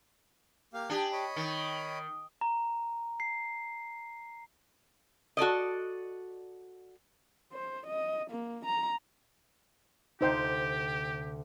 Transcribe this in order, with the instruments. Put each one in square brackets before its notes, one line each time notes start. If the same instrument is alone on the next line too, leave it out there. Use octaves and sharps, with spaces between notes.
[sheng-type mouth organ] A#3 G4 F5
[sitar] D4 G4 [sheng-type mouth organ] G#5
[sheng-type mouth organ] C#5 D#5 B5
[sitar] D#3
[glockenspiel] A#5
C7
[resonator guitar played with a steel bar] F#4 A4 D5 D#5
[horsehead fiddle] C5
D#5
A#3
A#5
[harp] D2 C3 [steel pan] D#4 C5 G5 [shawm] G4